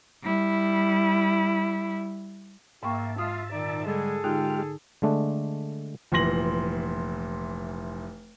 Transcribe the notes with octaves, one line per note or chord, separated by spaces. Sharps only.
G3 E4
G#2 A#3 E5 G5 A5 C#6
G#3 F4 F5 D#6
A#2 D#3 D#4 D5
D3 G3 G#3 G#4 A4
D3 G#3 D#4 F4 G4 G5 F6 F#6
D3 G#3 A3 D4
F1 A#2 E3 C6 A#6 F#7